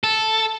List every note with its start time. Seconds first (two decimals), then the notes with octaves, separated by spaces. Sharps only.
0.04 A4